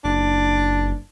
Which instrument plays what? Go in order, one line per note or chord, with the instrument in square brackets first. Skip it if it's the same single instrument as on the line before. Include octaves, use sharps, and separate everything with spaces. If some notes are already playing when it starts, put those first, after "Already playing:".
[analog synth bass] F#1 [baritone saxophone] D4